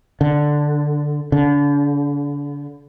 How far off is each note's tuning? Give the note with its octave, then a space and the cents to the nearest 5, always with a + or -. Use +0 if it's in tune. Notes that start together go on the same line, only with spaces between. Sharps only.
D3 +5
D3 -35